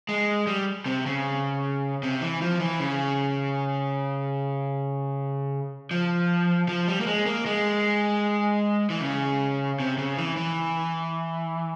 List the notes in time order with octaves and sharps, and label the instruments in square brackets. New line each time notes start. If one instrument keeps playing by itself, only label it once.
[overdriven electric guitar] G#3
G3
C3
C#3
C3
E3
F3
E3
C#3
F3
F3
G3
A#3
G#3
A#3
G#3
E3
C#3
C3
C#3
E3
E3